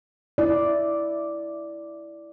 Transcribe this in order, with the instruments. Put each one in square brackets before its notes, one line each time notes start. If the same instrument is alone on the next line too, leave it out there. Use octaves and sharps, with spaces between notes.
[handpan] E4 D5